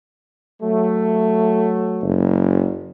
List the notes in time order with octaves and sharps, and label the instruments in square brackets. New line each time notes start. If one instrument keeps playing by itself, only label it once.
[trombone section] F#3 A3
[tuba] F#1